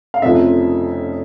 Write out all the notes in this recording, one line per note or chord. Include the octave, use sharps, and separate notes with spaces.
F5
F1 F2 C#3 F3 E5